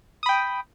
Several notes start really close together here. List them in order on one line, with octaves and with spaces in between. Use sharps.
D#6 B5 G5